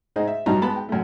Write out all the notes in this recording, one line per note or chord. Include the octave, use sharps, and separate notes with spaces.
G#2 D#4 G#4 C5 D#5
E5
B1 G2 F#3 D#4 A#5
G#3 B3 A5 B5
G5
F#2 A3